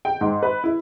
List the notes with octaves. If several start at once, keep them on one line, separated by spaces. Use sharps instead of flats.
G5
G#2
B4
E4